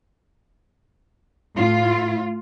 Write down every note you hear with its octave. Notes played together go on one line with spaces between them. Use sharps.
A2 F4